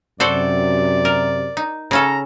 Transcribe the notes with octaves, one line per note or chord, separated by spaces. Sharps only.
F#2 C3 F#4 A4 C5 D5
A#4
D#4
C#3 C#4 A4 A#5